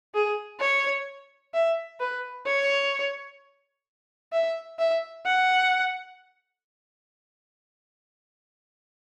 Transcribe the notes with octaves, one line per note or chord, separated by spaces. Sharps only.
G#4
C#5
E5
B4
C#5
E5
E5
F#5